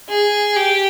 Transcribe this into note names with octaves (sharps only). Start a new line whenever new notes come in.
G#4
G4